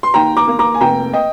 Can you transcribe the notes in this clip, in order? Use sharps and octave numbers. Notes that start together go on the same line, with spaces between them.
C6
D#2 G5 A#5
A#5 D6
A#3
A#5 D6
G#5
F1 G5 A#5
D#5 G5